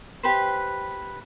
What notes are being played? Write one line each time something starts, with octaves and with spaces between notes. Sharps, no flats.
G4 B4 C5